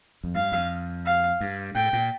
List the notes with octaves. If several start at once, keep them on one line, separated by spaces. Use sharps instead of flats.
F2
G2 F5
F2
F5
G2
A2 G5
A#2